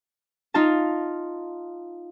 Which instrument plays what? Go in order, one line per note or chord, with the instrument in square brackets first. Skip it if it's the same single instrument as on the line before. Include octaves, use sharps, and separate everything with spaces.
[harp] D#4 F4 A5